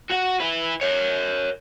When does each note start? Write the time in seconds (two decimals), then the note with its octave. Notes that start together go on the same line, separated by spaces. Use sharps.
0.10 F#4 F#5
0.40 E4 B4
0.81 A#4 C#5